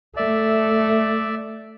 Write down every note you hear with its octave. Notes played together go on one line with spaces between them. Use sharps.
A3 D5 E5